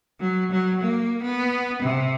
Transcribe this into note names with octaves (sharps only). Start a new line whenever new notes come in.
F#3
F#3
A#3
B3
C3